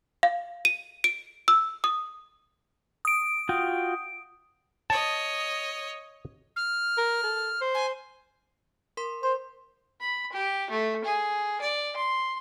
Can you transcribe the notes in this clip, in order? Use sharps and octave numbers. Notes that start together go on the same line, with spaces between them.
F5
D#7
D7
E6
D#6
D#6 D7
F4 F#4 G5
C#5 D#5 A5
F6
A#4
A4
C5
G#5
A#4 C6
C5 C6
B5
G4
A3
G#4
D5
C6